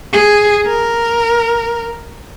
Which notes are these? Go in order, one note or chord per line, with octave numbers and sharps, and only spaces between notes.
G#4
A#4